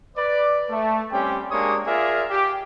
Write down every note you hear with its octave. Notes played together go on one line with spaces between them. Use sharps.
B4 D5
A3
G3 C4 C#4 G4 G5
G#3 A#3 D4 G4 C#5 D#6
F4 G#4 A#4 D5 E5 F5
G4